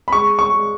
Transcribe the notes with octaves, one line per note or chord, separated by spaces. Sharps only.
B5
G#3 C#6
C#6
G#3